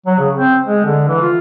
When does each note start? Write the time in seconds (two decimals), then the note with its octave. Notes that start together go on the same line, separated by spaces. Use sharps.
0.06 F#3
0.19 C#3
0.35 C4
0.66 G#3
0.85 D3
1.08 E3
1.21 F4